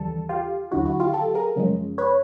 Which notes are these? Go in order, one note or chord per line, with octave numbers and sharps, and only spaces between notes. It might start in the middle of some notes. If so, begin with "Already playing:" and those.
Already playing: D#2 C#3 E3 G3 A4
F4 G4
D#2 D3 F#3 E4 F#4
E4 F#4
F4 G4
G4 A4
G#4 A#4
F#2 C#3 F3 G#3
B4 C#5